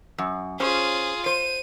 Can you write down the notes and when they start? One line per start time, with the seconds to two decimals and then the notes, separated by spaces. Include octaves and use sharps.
0.18 F#2
0.60 C#4 F4 G#4 C5
1.26 C5 D#7